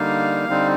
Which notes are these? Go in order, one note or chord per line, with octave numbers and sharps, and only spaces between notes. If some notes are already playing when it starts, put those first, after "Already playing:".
Already playing: D3 G3 A#3 D#4 F5
D3 G3 C4 D#4